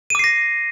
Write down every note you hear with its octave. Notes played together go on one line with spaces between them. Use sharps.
D6 A#6 C7 D#7